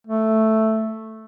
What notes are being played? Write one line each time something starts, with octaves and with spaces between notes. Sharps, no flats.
A3